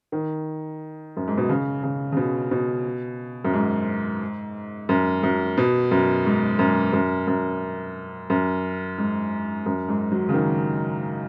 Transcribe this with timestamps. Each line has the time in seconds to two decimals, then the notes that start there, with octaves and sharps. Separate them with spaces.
0.12 D#3
1.17 F#2
1.28 G#2
1.37 B2
1.49 C#3
1.83 C#3
2.12 C#3
2.17 B2
2.51 B2
3.45 F#2
3.53 G#2
4.89 F#2
5.23 F#2
5.58 B2
5.91 F#2
6.25 G#2
6.59 F#2
6.93 F#2
7.27 F#2
8.30 F#2
8.98 G#2
9.66 F#2
9.88 G#2
10.12 F#3
10.29 C#3
10.34 D#3